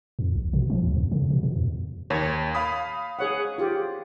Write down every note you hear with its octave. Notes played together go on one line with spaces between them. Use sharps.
F2
A#1
B2
F3
D2
F2
C#3
B2
B2
E2
D#2 C#5
F5 B5 D#6
G#4 C#5 F#5
F4 G4